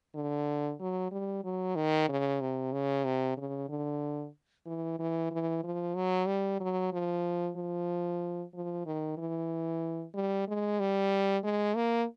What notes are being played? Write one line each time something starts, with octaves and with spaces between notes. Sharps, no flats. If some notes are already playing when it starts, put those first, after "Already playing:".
D3
F#3
G3
F#3
D#3
C#3
C3
C#3
C3
C#3
D3
E3
E3
E3
F3
F#3
G3
F#3
F3
F3
F3
D#3
E3
G3
G#3
G3
G#3
A#3